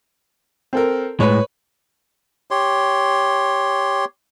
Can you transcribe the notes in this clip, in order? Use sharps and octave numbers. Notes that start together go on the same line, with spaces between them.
C4 A4 A#4
A2 G#3 B4 C#5
G4 C#5 C6